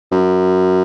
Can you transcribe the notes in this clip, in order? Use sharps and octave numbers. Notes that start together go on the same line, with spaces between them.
F#2